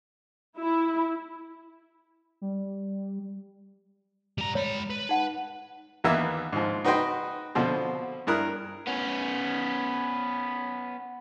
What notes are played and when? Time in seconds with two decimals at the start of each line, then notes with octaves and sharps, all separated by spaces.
0.58 E4
2.41 G3
4.38 G3 A#5
4.55 G#3 C#5 B5
4.90 B4
5.09 D#4 F#5
6.04 D#2 E3 A#3 B3 E5
6.53 G#2 F3
6.84 D#4 F#4 B4 D#5 G5 C6
7.55 B2 D3 F3 C4
8.27 G2 E4 A#4 D#6 F#6
8.87 B3 C#4